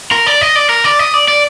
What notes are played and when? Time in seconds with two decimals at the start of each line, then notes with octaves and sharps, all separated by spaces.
0.12 A#4
0.27 D5
0.41 D#5
0.56 D5
0.69 A#4
0.84 D5
0.99 D#5
1.14 D5
1.28 D5